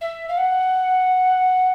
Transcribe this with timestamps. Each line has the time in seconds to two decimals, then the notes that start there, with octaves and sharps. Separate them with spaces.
0.01 E5
0.28 F5
0.37 F#5